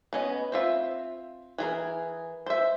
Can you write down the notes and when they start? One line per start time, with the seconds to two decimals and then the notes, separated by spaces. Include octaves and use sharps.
0.13 B3 C#4 D#5
0.52 C4 F4 E5
1.58 E3 G#4 A#4
2.46 C5 E5